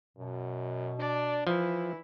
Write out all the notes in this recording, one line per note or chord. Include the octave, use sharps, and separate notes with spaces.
F#2 B2
D4 D5
E3 F3 E4